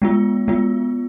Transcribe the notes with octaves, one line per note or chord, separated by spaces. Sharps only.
G#3 B3 F4
G#3 B3 F4